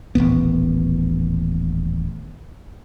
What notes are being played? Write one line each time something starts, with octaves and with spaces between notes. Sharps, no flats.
D#1 A1 A2 B3